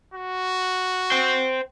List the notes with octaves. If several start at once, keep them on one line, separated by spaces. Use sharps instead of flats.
F#4
C5 G5